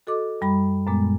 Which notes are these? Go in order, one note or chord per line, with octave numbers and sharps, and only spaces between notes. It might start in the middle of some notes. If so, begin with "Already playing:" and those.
F#4 A4 D#5 D6
F#2 G3 B5
F#2 A#2 G#3 B3